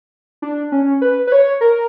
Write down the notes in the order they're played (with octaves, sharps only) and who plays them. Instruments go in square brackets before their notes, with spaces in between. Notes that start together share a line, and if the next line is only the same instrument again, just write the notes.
[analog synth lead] D4
C#4
B4
B4
C#5
A#4